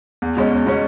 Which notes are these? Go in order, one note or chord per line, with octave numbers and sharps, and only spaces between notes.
E2
B2 G#3 C#4
E2
B2 G#3 C#4